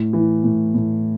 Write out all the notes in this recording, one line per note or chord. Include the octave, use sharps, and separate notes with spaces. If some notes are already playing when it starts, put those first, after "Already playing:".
Already playing: A2
E3
A2
A2